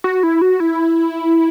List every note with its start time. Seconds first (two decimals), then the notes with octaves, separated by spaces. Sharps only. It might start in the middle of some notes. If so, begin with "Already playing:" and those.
0.04 F#4
0.23 E4
0.41 F#4
0.60 E4